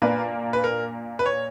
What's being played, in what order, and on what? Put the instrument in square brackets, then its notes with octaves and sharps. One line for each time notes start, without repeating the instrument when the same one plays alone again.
[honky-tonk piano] A#2 A#3 D4 [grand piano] B4
[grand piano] B4
A#4
B4
C#5